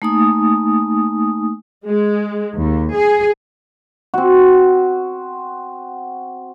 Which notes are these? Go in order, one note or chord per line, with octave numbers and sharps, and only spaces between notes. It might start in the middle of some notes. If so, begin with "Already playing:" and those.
A3 A#3 D#4 G#5 D#6
G#3
D#2
G#4
C4 F#4